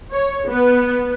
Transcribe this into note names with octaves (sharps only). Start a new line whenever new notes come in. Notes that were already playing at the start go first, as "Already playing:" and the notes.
C#5
B3